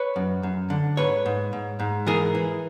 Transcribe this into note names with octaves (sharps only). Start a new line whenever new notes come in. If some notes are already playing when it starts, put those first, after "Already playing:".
Already playing: B4 C#5
F#2
F#2
D3
G#2 B4 C#5
G#2
G#2
G#2
E3 G#4 A#4
E3